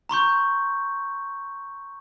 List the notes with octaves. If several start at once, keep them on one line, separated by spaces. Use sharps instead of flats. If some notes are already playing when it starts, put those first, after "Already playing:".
A#5 C6 C#6 G6